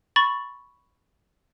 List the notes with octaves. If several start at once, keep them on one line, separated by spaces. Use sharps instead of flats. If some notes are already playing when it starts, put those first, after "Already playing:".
B5 C#6 A6